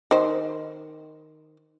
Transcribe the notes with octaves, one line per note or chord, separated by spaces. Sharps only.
D#3 C5